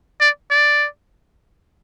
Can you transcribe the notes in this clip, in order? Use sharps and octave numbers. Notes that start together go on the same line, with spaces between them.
D5
D5